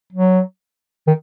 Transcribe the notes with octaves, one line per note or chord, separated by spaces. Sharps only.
F#3
D#3